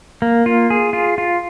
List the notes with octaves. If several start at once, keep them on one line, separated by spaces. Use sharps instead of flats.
A#3
F4
G#4
F4
F4